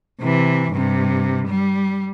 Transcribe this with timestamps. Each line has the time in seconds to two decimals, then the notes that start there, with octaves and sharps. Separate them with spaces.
0.21 C3 E3
0.72 G2 C3
1.48 G3